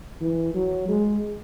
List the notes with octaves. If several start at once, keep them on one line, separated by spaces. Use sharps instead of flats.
E3
F#3
G#3